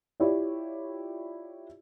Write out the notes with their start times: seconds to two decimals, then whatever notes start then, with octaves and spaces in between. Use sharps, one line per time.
0.20 E4 F4 G4 C#5 D5